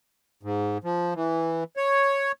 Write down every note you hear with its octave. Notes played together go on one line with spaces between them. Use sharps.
G#2
F3
E3
C#5